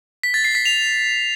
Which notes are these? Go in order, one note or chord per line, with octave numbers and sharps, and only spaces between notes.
B6
A6
C7
B6
F7